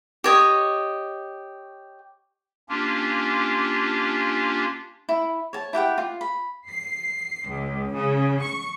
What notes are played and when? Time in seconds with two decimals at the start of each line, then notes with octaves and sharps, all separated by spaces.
0.24 G4 C#5 D#5
2.69 A#3 C#4 D4 F4 G4
5.09 E4
5.53 C#5 A5
5.73 E4 G4 F#5 G5
5.98 F4
6.21 B5
6.67 C7
7.46 C#2
7.95 C#3
8.41 C#6